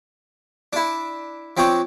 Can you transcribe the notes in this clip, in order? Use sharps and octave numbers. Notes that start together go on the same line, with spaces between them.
D4 E4
F3 C4 D4 C#5